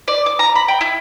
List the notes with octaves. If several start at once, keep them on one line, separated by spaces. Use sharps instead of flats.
D5
D6
A#5
B5
G5
E4